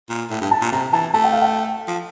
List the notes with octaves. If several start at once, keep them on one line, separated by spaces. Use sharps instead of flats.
A#2
A2
G2
A5
A#2
C3 A#5
E3 A5
A3 A5
G5
F5
G5
F3